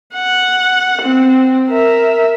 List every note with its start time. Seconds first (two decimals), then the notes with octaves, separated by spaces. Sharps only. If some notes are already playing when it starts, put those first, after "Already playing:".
0.14 F#5
1.01 C4
1.69 A#4 E5